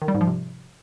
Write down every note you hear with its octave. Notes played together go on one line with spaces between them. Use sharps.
D#3
G3
G#2
F3
C3